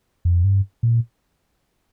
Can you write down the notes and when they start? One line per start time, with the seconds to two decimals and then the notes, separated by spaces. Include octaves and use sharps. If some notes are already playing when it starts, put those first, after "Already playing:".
0.25 F2
0.44 G2
0.83 A#2